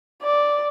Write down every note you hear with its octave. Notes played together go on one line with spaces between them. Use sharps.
D5